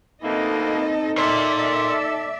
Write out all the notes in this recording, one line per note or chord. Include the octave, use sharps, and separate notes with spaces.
D2 E3 A#3 C4 D#4 A4 D#5
A4 A#4 D5 E5 C6